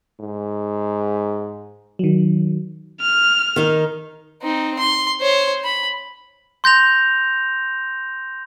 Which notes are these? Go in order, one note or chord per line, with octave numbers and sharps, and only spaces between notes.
G#2
D#3 F#3
F6
D#3 D#4
C4 D#4
C6
C5 C#5
B5
C6 G6 A#6 F7